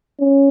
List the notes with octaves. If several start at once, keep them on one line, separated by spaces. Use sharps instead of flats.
C#4